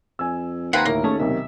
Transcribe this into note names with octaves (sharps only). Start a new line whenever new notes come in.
F2 G#5 E6
D#2 F3 C4 B4 F5 F#5 G#5 A#5
D2 A2 A#3 A#4
A3 C#4 G#4 A5
B1 C3 D#3 E5